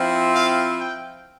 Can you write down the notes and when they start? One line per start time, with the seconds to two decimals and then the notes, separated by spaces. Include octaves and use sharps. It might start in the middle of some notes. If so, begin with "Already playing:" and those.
Already playing: F3 C4 E4
0.35 F5
0.79 G5